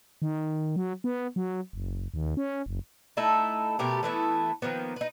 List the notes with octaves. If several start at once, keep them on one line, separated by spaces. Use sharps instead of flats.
D#3
F#3
B3
F#3
F#1
D#2
C#4
F#1
A3 D#4 E4 A4
B2 A3 G4 A#4
E3 A3 B3 E4
D#3 F3 A#3 B3
D#4 B4